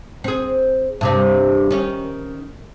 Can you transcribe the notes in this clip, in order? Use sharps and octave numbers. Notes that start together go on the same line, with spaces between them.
C4 G#4
G2 C3 C4
D#3 C#4